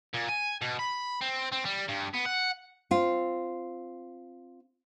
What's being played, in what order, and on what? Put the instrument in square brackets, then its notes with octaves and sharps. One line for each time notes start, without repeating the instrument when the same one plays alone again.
[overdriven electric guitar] A#2
G#5
B2
B5
C4
C4
G3
G2
B3
F#5
[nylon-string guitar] C4 F4